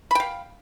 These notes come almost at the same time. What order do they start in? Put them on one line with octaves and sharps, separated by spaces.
B5 G5 F5